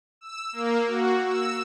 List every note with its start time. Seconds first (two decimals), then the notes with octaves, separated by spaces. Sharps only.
0.21 E6
0.52 A#3
0.87 F#4
1.25 E6